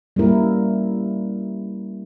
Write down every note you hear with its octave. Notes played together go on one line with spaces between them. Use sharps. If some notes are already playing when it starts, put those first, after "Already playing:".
G3 A#3 C#4 E4 A#4